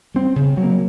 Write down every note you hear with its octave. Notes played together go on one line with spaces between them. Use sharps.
G3 C4
C#3
F#3
A#3